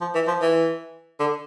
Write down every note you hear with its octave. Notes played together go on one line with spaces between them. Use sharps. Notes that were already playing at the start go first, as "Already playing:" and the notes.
F3
E3
F3
E3
D3